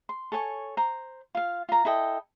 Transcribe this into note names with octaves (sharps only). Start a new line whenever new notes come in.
C6
A4 C#5 G#5 C#6
C5 A#5
F4 F5
F4 A#5
E4 A4 D#5 G5